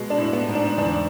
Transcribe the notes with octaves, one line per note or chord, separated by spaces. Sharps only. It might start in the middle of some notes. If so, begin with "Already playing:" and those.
Already playing: B2 G#3
D4
A2
B3
G#2
D4
E2 D4